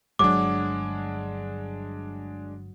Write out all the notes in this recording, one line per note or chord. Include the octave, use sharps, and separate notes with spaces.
D1 G1 F#3 G#3 D4 D6